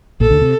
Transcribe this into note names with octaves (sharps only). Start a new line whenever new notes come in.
A#1 A#2 A4
D2 D3
C3